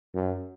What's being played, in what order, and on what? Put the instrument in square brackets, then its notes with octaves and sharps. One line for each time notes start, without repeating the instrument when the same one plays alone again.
[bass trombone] F#2